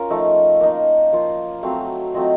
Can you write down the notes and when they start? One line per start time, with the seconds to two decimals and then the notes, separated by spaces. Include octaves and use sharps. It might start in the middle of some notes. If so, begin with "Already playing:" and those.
Already playing: C#4 F4 A#4
0.10 F3 A3 D#4
0.61 A#3 D#4
1.12 F3 A#3 F4
1.63 F#3 A3 C4 F5
2.14 F#3 A3 C4 F4 D#5